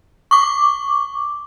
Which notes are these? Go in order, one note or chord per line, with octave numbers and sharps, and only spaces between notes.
C#6 D6